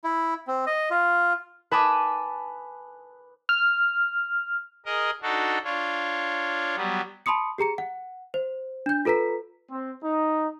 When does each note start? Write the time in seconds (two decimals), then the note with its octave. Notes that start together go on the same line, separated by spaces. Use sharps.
0.04 E4
0.47 C4
0.67 D#5
0.91 F4
1.71 B4 G#5 A5 B5 D6 D#6
3.49 F6
4.86 G#4 A#4 D#5
5.22 D4 D#4 F#4 A4
5.64 D4 F4 C#5
6.76 F#3 G3 B3
7.26 A5 B5 C6 D#6 C#7
7.58 G4 G#4 A#5 C#7
7.78 F#5
8.34 C5
8.86 D4 G6
9.05 F4 A4 B4 A#5 B6
9.70 C4
10.04 D#4